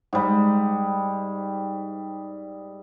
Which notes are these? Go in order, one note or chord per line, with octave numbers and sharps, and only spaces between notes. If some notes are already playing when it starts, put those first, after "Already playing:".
G#2 G3